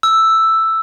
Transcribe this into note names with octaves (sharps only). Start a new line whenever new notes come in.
E6